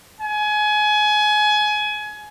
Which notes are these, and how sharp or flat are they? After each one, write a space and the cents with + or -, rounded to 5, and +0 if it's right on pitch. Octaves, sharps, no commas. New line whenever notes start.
G#5 +25